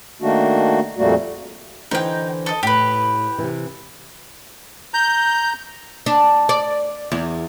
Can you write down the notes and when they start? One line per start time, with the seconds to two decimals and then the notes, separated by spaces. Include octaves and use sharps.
0.22 D#3 A3 A#3 D4 F#4
0.98 F2 A#2 G3 A3 A#3 F#4
1.91 D3 E3 D#4 C5 G5
2.46 A4 D#5
2.63 A2 G4 B4
3.38 C3 E3
4.94 A#5 G6
6.06 D4
6.49 D5
7.12 E2